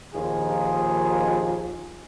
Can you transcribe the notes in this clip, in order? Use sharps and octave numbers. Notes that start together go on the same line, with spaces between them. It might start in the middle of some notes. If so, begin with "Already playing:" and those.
A#1 D#2 F3 D#4 F4 G#4